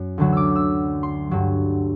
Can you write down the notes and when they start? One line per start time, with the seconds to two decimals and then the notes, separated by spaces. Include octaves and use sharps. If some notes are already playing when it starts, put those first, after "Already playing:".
Already playing: F#2
0.18 D2 D3 F#3
0.32 D6 E6
0.56 E6
1.03 C6
1.31 G2 F#3